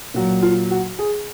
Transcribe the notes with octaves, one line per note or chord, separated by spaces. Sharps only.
A#2 F#3
F4
F#4
G#4